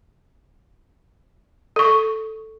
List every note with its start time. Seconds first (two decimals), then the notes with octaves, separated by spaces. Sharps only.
1.76 A4 C#6